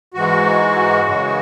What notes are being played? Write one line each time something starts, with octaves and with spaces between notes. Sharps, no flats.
G#2 E3 G#3 F#4
F#2 C#3 E3 G#3